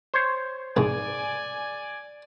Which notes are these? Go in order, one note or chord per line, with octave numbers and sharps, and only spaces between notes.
C5 C#5
C2 G#2 D5 G#5